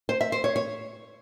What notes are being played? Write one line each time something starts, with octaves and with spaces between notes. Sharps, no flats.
C5
E5
C5
C#5
C#5